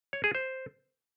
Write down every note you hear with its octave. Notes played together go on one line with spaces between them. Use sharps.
C#5
G#4
C5